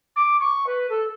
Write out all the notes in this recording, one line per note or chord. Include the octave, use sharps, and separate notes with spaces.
D6
C#6
B4
A4